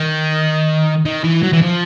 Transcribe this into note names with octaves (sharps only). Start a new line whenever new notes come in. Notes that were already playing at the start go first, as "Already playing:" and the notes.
Already playing: D#3
D#3
E3
F#3
E3
F3